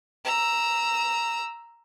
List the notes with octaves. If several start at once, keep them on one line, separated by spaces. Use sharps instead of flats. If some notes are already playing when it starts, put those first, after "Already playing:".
A#5 E6